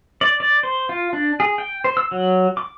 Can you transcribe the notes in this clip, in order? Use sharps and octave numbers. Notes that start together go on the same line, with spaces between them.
D5
D5
C5
F4
D4
G#4
G5
C5
E6
F#3
D6